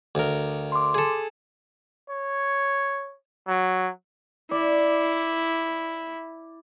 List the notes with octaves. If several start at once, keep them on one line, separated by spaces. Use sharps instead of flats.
D2 A#4
C6 D6
G#4 A4
C#5
F#3
E4 D5